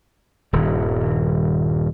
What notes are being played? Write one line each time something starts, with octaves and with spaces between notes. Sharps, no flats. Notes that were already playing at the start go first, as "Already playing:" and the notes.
D#1 G2 D#3